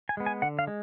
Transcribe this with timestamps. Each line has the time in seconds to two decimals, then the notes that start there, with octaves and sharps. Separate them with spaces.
0.09 G#5
0.17 G#3 B3
0.26 G#5
0.42 D3 F#5
0.59 F5
0.67 G#3